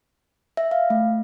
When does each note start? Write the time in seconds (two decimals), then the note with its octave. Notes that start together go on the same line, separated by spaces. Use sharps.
0.57 E5
0.71 F5
0.90 A3